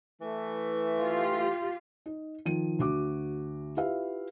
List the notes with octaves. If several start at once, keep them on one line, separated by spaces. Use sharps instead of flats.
E3 A3
F4 G4
D#4
D#3 F3 D#7
D2 F#4 D6
E4 F4 G4 B4 E5 F5